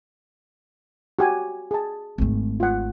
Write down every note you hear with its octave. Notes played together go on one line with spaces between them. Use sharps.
F#4 G4 G#5
G#4 A5
G#1 A3
F4 F#5